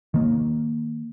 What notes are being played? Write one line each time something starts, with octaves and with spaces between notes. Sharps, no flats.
D#3 A#3